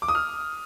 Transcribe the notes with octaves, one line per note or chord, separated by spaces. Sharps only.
D6
D#6
F6